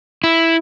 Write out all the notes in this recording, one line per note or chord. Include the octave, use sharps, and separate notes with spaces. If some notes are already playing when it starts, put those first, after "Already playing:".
E4